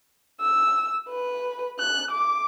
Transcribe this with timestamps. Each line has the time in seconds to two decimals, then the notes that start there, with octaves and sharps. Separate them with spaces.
0.41 E6
1.09 B4
1.79 F#6
2.11 D6